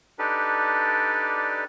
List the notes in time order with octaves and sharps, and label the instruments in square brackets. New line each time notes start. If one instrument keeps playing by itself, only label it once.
[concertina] D4 D#4 G4 A4 B4 D5